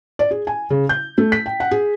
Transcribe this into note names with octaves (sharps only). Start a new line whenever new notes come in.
D5
G#4
G#5
C#3
G6
A3
B6
G5
F#5
G#4